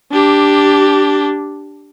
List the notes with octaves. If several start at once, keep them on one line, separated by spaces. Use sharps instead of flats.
D4 G4